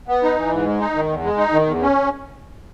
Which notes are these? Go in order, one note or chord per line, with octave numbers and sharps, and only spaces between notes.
B3
D#4
E3
G#2
G#3
D#4
D#3
E2
G#3
D#4
D#3
E2
C#4